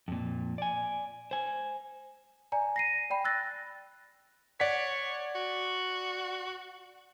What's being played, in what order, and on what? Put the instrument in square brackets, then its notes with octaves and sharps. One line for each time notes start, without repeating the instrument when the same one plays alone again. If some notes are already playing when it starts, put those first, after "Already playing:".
[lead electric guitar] F2 A#2
D5 G#5
C5 G#5
[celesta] D5 G#5 A#5
A#6 C7 D#7
D5 G5 B5
E6 F#6 A6 A#6
[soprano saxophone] C#5 [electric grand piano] D5 F#5 B6
[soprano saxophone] F#4